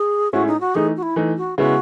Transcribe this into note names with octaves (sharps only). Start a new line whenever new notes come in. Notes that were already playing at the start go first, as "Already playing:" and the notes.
Already playing: G#4
A2 G#3 C#4 E4 F#4
D#4
F#4
E3 A3 D#4 G#4
F#4
E4
E3 A3 D#4
F#4
C#3 G#3 B3 E4 F#4